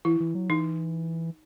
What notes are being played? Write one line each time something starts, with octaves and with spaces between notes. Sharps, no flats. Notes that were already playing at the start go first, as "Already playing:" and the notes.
E3 E4
E3
F#3
E3 D#4